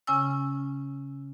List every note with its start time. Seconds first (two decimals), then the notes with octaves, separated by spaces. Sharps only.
0.07 C#3 C#4 G#5 E6